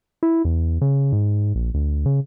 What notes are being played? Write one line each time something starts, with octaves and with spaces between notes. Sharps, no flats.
E4
E2
C#3
G#2
A#1
D2
C#3